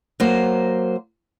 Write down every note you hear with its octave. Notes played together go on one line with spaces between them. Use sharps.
F#3 A#3 C5